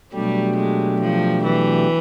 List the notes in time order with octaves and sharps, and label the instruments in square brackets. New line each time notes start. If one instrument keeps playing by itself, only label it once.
[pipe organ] B2 F#3 A3 D4 G4 [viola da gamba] G3
[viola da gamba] G#3
F3
E3